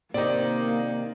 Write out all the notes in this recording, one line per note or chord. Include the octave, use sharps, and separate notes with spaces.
C3 D#3 A#3 D#4 D5